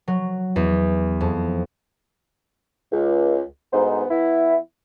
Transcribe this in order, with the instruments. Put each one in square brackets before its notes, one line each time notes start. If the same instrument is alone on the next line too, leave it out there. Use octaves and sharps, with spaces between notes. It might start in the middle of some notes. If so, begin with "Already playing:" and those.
[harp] F#3
E2
F2
[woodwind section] C#2
D2 G#2 B3 D#4 C5
E3 B3 E4